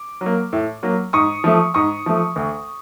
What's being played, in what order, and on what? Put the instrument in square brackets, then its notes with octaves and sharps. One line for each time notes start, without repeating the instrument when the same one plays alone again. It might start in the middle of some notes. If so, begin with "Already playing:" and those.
Already playing: [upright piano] D6
F#3
A#3
A2
F#3 A#3
G#2 C#6 D#6
F3 A3
G#2 C#6 D#6
F3 A3
D2